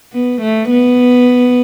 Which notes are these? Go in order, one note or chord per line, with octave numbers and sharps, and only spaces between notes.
B3
A3
B3